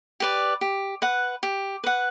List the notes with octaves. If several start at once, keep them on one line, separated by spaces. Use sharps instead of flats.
G4 B4 D5
G4
B4 F#5
G4
B4 F#5